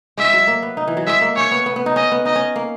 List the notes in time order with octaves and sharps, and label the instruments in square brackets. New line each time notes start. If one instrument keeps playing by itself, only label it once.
[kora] G#3 [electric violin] E5
[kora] F#3
A#3
B3
D#4
E3
F#3
[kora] G#3 [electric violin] E5
[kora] A#3
[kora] C#4 [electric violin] C#5
[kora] B3
B3
B3
D#4
[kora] C#4 [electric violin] D#5
[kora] B3
[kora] D#4 [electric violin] D#5
[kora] C#4
A#3